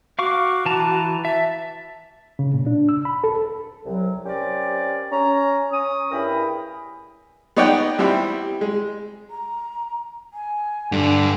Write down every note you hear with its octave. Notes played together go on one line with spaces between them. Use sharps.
F#4 F5 C#6 D6
E3 A5 A#5
E5 A5
C#3
A#2
D4
E6
B5
A4
C2 F#3
C4 C#4 G4 A#4 D5
C#4 A#5
C#4 D#6
G2 E4 G#4 A#4 G5 B5
B3 D#4 C#5 D5 F#5 G5
G3 C4 E4 G4
G#3
A#5
G#5
G2 D3